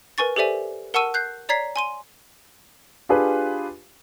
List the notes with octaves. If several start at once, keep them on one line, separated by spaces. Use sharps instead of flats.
A#4 B4 G#5 C#6 A6
G4 A4 C5 D5 E5 G#5
A#4 F#5 A5 C#6 E6 D#7
F#6 G6 C7
C#5 D5 A#5 G#6 B6 C7
G#5 C6 D#7
D4 F4 G4 G#4 B4